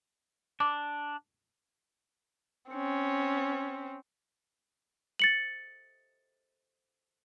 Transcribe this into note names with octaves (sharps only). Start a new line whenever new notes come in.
D4 D6
C4 C#4
A6 C#7 F#7